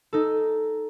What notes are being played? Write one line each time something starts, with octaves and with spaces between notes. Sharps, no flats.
D#4 A4